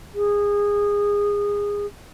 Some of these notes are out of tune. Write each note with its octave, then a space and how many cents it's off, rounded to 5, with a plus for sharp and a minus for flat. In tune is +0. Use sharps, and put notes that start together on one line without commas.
G#4 -20